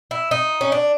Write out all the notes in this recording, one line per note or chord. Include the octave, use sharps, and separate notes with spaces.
E4
D#4
C#4
D4